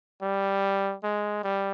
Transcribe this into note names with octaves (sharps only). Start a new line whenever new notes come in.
G3
G#3
G3